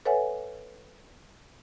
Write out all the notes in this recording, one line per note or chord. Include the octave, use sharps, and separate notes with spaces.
A4 B4 C#5 E5 F#5 G#5